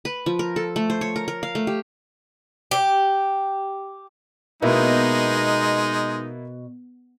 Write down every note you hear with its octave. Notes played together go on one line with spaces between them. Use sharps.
B4
F3
A#4
A4
A3
C5
C#5
A#4
A#4
F5
A3
G4
G4
B2 G#3 A#3 B3 D#4 E4